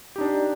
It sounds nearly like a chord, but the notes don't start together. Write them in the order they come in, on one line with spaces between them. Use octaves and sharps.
G4 D#4 D4